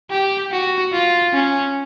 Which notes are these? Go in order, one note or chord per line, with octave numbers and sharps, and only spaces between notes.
G4
F#4
F4
C#4